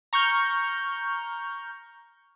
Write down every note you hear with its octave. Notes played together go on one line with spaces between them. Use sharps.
A#5 C#6 F6 G6